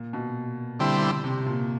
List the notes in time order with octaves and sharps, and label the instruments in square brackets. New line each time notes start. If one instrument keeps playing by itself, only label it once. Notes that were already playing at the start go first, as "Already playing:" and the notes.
Already playing: [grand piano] A#2
B2
[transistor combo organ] D3 G3 C4 E4
[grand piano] C3
A#2